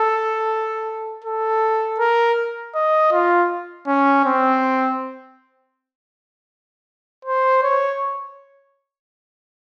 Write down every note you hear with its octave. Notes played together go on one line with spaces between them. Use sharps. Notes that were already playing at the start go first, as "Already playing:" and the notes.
Already playing: A4
A4
A#4
D#5
F4
C#4
C4
C5
C#5